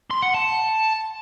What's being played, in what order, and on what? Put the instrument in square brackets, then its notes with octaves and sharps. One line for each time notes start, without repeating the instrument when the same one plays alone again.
[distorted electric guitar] C6
F#5
A5